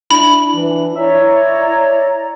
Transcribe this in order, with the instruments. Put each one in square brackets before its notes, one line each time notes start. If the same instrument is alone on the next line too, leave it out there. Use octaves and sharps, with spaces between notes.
[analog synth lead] D4 [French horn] E4 [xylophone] B5
[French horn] E3
[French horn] E4 [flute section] C#5 D5 A#5 [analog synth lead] E5